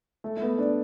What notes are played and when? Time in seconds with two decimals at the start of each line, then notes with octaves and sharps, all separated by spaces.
0.24 A3
0.37 A3
0.42 B3
0.58 D4